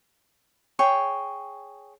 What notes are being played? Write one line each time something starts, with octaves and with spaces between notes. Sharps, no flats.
G#4 C#5 G5